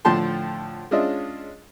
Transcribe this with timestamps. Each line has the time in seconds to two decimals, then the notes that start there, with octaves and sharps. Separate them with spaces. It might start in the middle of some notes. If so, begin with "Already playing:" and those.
0.05 A2 D3 F3 G5 A5 C6
0.91 G#3 C#4 D4 F4 D#5 E5